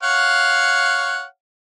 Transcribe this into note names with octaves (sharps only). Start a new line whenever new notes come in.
C#5 F5 F#5